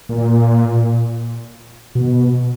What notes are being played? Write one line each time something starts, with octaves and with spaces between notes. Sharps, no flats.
A#2
B2